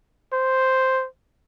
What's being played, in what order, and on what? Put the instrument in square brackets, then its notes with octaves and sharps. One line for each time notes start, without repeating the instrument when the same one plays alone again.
[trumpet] C5